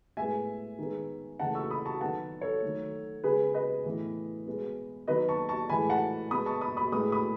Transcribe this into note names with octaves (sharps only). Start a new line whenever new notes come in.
A2 G#3 B3 E5 G#5
D#3 G#3 B3
C#3 E3 A3 F#5 A5
C#6 E6
B5 D#6
A5 C#6
D#3 F#3 B3 F#5 A5
A4 C#5
D#3 F#3 A3
C#3 G#3 B3 G#4 B4
B4 D#5
A2 E3 B3
B2 G#3 B3
D#3 F#3 B3 B4 D#5
A5 C#6
A5 C#6
A2 E3 G#3 G#5 B5
F#5 A5
B2 G#3 B3 B5 D#6
A5 C#6
B5 D#6
B5 D#6
A2 G#3 B3 B5 D#6
B5 D#6